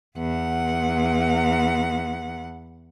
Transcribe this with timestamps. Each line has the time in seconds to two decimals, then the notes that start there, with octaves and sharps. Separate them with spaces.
0.17 E2 F#5